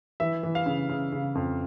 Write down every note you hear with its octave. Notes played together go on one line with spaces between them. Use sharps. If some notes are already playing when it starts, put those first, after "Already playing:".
E3 E5
E3
F5
C#3
C#3
C#3
F2